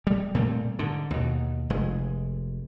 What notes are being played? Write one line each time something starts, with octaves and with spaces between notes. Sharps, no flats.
G3
A#2 G3 A3 C4
G#2 D3
D#2 B2
F1 G#3